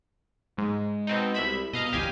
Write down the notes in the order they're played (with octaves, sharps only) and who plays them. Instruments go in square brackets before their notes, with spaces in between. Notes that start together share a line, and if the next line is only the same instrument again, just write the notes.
[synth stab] G#2 [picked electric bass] G#3
[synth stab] B2 C4 D#4
C2 E5 B5
[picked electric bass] B2 [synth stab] D#5 F5 A#5
[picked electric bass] F1 C#2 E3 [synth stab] G4 F5 G#5